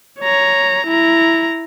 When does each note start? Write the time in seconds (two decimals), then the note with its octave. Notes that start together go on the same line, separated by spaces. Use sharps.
0.20 C#5 A#5
0.87 E4 A#5